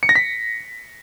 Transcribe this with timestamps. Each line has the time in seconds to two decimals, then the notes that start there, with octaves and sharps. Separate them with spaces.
0.03 C#7
0.09 A#6
0.15 B6